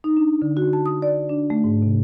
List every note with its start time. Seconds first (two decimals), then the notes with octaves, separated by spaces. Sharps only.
0.04 D#4
0.17 D4
0.42 D3
0.57 F#4
0.73 A5
0.86 D#6
1.02 D5
1.29 D4
1.50 A3
1.64 G#2
1.82 C3